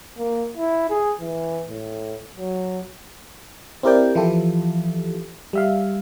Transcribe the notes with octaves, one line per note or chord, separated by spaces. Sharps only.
A#3
E4
G#4
E3
A2
F#3
C4 E4 G4 A#4 D5 G5
E3 F3 E4 F4 G4 A4
G3 E5 F5